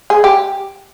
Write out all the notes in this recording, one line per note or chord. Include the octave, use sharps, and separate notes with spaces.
G#4
G4